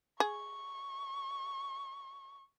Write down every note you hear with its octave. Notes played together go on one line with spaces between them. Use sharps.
G#4 C#6